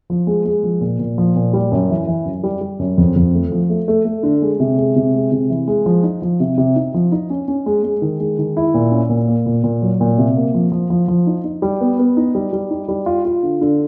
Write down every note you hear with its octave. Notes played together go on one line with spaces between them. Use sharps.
F3
G#3
G#3
F3
A#2
A#2
F3
A#2
G3
F#2
E3
E3
F#2
G3
G3
F#2
F2
F2
A3
F3
A3
A3
A3
D3
G#3
C3
G#3
C3
G#3
C3
E3
G#3
F3
D#4
F3
C3
C3
D#4
F3
D#4
C#4
C#4
G#3
G#3
D#3
G#3
D#3
E4
A#2
C#4
A#2
A#3
A#2
A#2
F#3
A#2
C3
A#3
F3
F3
F3
F3
D#4
D#4
G3
B3
B3
D#4
G3
G3
D#4
G3
F4
F4
D3
D3